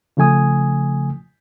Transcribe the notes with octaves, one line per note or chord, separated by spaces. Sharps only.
C#3 F3 A3 G#5 D#6